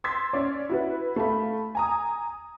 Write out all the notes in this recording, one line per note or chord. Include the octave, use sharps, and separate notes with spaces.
C6 E6 G#6 A6 B6
C#4 D5
E4 F#4 B4
A3 F5 B5
G#5 A#5 D#6